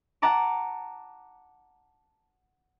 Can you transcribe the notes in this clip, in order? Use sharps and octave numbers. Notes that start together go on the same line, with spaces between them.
F#5 A5 A#5 D6